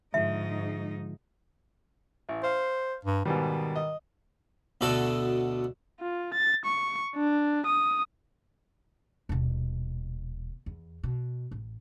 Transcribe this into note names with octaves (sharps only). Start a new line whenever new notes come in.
G#2 D3 F3 G#3 D#4 E5
A1
C5 F5
G2
G#2 B2 D#3 G3
D#5
D2 B2 F#4 A4
F4
A6
C#6
D4
D#6
D#1 B2
E2
B2
A1